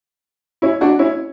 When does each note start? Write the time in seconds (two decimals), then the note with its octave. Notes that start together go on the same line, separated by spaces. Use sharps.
0.62 C#4 E4
0.81 D4 F#4
0.99 C#4 E4